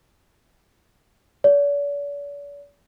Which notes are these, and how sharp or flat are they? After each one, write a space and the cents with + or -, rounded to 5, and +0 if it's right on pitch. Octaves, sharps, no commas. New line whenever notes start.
D5 -45